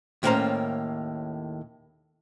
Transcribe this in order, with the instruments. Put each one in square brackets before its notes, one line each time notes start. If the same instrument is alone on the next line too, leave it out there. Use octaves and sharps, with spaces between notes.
[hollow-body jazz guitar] D#2 A2 A#3 C#4 C5 A#5